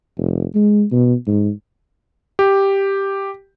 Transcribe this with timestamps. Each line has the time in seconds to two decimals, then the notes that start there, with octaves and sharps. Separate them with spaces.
0.17 F1
0.55 G#3
0.92 B2
1.27 G#2
2.39 G4